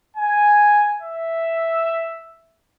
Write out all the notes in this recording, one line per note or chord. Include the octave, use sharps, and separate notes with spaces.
G#5
E5